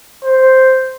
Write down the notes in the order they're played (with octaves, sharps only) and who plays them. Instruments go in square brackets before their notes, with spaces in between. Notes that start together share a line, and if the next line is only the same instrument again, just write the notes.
[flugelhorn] C5